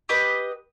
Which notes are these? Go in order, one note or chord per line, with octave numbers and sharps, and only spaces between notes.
G4 B4 D#5